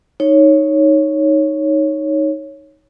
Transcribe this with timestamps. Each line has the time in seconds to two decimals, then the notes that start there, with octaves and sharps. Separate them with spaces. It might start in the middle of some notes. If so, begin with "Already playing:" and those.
0.20 D#4 C#5